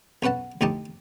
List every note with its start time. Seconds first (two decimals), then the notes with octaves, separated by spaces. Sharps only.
0.23 B1 C#4 B4 F#5 A5
0.61 D2 A2 D#4 G4 A5